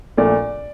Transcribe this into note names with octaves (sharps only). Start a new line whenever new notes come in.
A#1 A#2 A3 D5